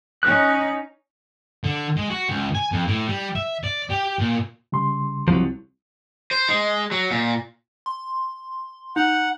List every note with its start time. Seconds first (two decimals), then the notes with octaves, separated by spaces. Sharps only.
0.23 C#4 D#4 F#6
1.64 D3
1.97 G#3
2.10 F#4
2.29 C#2
2.55 G#5
2.72 F2
2.87 A2
3.08 G3
3.35 E5
3.64 D5
3.90 G4
4.19 A#2
4.72 C#3 G3 C6
5.28 C2 F3 F#3
6.31 C5
6.48 G#3
6.92 F#3
7.11 A#2
7.86 C6
8.96 D#4 F#5